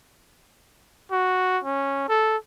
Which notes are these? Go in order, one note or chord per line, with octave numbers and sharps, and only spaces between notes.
F#4
C#4
A4